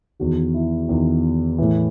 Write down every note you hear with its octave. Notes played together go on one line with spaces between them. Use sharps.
E2 D#3 F#4
E4
E2 D#3
A2 E3